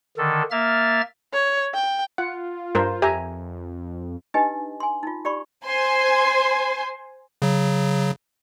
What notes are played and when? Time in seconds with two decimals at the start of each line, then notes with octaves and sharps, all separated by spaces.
0.17 D3 D#3 A4
0.51 A#3 E5 F6 A6
1.33 C#5
1.74 G5
2.18 F4 F#5
2.75 G2 A#4 C5
3.02 F2 G4 E5 G#5 A#5
4.34 D4 D#4 G4 B4 D#5 G#5
4.80 G#5 C6
5.03 D#4 F4
5.25 G4 D5 B5 C#6
5.65 C5 G#5 C6
7.42 C#3 F#3